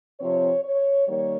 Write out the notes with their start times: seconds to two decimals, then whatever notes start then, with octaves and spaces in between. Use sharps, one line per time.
0.19 C3 F3 C4 C#5
0.63 C#5
1.08 D#3 G3 A#3 C#5